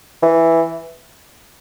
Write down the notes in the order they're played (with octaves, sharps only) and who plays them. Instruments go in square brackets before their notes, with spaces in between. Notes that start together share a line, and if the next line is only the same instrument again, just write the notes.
[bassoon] E3